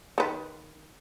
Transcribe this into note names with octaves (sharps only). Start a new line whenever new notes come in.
D#3 B4